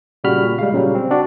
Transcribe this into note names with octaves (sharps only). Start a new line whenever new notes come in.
A#2 C#3 G3 F#4 B5 F6
A#2
G3 G#3 F5
A#2 C#3 F#3 G3
C4
D4 F#4 D5